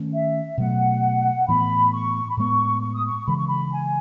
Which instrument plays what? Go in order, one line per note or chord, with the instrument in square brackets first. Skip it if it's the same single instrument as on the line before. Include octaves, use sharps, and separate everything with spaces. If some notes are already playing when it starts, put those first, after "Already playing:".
Already playing: [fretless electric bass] D#3 A3 C#4
[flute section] E5
[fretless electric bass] B2 F#3 A3 [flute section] F#5
[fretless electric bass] A2 E3 B3 [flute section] B5
[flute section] C#6
B5
[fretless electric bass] A2 G#3 B3 [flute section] C#6
[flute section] C#6
D#6
C#6
[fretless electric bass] C#3 E3 G#3 [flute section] B5
[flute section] C#6
B5
G#5